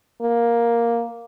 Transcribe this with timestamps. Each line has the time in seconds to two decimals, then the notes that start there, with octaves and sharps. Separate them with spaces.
0.21 A#3